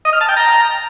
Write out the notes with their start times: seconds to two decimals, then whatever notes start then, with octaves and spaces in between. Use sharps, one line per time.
0.05 D#5
0.13 F6
0.21 A5
0.29 G5
0.37 A#5